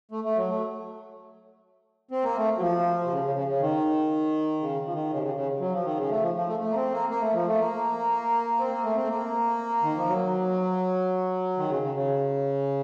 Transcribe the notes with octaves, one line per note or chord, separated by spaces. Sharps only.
A3
A3
F#3
A3
C4
A#3
A3
F#3
F3
C3
C#3
C#3
C#3
C#3
D#3
C#3
F3
D#3
C#3
C3
C#3
C#3
F#3
F3
D#3
C#3
A3
F3
F3
A3
A3
A#3
C4
A#3
A#3
A3
F3
A3
A#3
C4
A#3
A3
C4
A3
A#3
D#3
F3
F#3
D#3
C#3
C#3
C#3